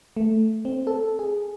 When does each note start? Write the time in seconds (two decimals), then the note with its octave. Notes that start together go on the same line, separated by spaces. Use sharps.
0.17 A3
0.65 C4
0.87 A4
1.19 G#4